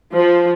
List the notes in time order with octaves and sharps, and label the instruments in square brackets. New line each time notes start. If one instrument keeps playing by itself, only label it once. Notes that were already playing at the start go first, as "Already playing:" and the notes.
[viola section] F3